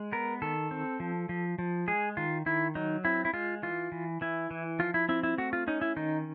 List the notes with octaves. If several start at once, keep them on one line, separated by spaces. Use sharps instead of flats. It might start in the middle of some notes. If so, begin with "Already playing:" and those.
Already playing: G#3
B3 A#4
D#3 A4
C4
F3
F3
F3
G#3 G#4
D#3 F4
D#3 E4
F#3 D#4
C4 E4
E4
G#3 F4
E3 F4
E3
E3 E4
E3
F3 F4
E4
C4 E4
E4
A3 F#4
F4
C#4 D#4
E4
D#3 D#4